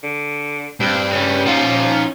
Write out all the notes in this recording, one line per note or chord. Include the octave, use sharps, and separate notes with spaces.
D3
G2 C4
C#3 G3 C#4
F3 D#4 F4 F#5